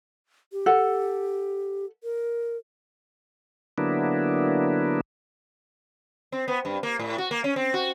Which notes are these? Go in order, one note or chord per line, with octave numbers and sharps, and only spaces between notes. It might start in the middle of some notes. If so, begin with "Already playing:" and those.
G4
A4 F#5
A#4
D3 F#3 A#3 B3 D4 E4
C4
B3
G2
A#3
A2
F#4
A#3
C#4
C4
F#4